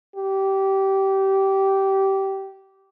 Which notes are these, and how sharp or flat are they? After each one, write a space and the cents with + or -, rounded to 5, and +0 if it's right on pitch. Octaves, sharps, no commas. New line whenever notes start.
G4 -20